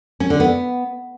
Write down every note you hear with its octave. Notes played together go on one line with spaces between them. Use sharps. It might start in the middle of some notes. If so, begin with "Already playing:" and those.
C#4
D3
B3